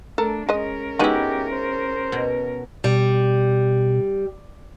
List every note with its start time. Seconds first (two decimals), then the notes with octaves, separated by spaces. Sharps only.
0.18 A3 D4 A4 A#4
0.49 G#3 C#4 A#4 D#5
0.99 G#3 B3 D#4 E4 F#4 G4
1.52 C5
2.12 B2
2.84 B2 G3